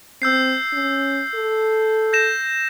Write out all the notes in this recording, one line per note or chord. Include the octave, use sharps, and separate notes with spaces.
C4 E6 G6 C7
C#4
A4
G6 A#6 E7